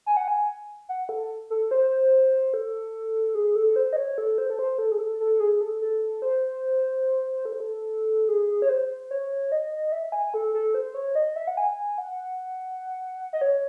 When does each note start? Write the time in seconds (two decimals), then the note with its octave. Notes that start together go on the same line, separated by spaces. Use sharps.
0.06 G#5
0.17 F#5
0.28 G#5
0.89 F#5
1.09 A4
1.50 A4
1.71 C5
2.54 A4
3.35 G#4
3.56 A4
3.76 C5
3.93 D#5
3.96 C#5
4.18 A4
4.38 C5
4.50 A4
4.59 C5
4.79 A4
4.92 G#4
4.99 A4
5.20 A4
5.40 G#4
5.61 A4
5.81 A4
6.22 C5
7.45 A4
7.52 C5
7.60 A4
8.29 G#4
8.62 C#5
8.69 C5
9.11 C#5
9.52 D#5
9.92 E5
10.12 G#5
10.34 A4
10.54 A4
10.75 C5
10.94 C#5
11.15 D#5
11.36 E5
11.47 F#5
11.57 G#5
11.98 F#5
13.33 D#5
13.41 C#5